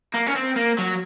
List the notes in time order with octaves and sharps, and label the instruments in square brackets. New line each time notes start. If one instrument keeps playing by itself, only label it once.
[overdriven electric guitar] A#3
C#4
C4
A#3
F#3